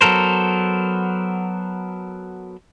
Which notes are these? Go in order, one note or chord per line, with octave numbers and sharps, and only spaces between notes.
F#3 B3 A4 A#4 C5